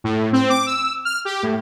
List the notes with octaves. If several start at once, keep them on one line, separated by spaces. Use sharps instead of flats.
A2
C4
D6
E6
F6
G4
A2